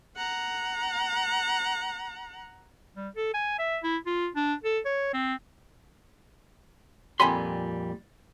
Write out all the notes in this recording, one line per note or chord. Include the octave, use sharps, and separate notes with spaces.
F#5 A#5
G3
A4
G#5
E5
E4
F4
D4
A4
C#5
C4
F2 A#2 G3 G#5 B5 C6